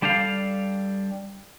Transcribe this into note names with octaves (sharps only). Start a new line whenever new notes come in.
G3 D4 G4 A4 F5